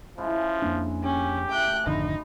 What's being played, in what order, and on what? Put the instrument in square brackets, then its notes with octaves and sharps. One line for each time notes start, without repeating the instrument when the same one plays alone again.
[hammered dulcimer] C#3 G#3 E4 [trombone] F3
[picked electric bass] F2 A#3 D4
[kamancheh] C#4 [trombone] G4
[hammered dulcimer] A3 F#4 D6 [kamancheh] G5 F#6
[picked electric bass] G#1 F2 D3 [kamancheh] D#4 [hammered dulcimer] B5 C6